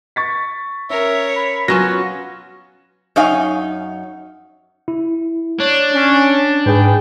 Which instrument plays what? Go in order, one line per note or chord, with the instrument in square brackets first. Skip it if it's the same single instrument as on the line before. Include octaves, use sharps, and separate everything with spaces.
[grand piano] C#6 A6 B6
[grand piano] C#4 [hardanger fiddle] A#4 C#5 [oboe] E5
[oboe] B5
[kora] F#3 C#4 F4 [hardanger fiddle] B3 [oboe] F#4 [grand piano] A#6 E7
[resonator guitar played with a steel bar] F#2 D#4 C#5 F5 G#5
[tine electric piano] E4
[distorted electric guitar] D4 [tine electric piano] C#5
[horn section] C#4
[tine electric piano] G#2 [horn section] G#4 B4 G5